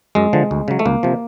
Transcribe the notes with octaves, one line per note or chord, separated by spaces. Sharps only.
F#2 G#3
D3 F3
D2
C#3 F#3
A3
C#2 A#3
C3 F3